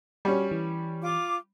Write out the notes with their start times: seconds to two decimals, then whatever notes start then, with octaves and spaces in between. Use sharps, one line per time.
0.25 G3 C#4 F#4
0.51 E3
1.01 F4 D6